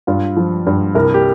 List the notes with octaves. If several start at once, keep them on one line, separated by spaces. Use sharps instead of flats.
G2 F4
F3
G2
C2 A#4
G4